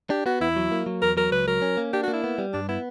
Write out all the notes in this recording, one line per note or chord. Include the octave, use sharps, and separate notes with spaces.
D4 G4
B3 F#4
E2 E4
F#3
A#3
F#3
E2 A#4
F#3 A#4
C#2 B4
F#3 A#4
C#4
A#3
D4 G4
F#4
A#3
E4
B3
G3
G2 D4
B3 E4